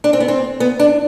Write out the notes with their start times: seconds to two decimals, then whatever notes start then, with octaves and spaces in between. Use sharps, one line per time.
0.04 D4
0.13 C4
0.20 B3
0.28 C4
0.60 B3
0.79 D4